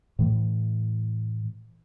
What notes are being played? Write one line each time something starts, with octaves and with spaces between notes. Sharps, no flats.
A2 E3 A3